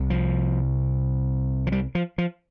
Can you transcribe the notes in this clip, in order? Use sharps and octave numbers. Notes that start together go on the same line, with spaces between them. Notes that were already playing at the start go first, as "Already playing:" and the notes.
Already playing: C2 C3
F3
F3
G3
F3
F3